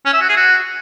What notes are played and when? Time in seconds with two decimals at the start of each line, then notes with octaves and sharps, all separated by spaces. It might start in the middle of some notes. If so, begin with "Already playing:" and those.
0.06 C#4
0.13 E5
0.21 F#4
0.29 G#4
0.37 F#4